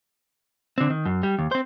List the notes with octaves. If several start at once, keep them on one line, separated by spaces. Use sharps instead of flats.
D3 C4
D#3
F#2
G3
D#2
C4 C5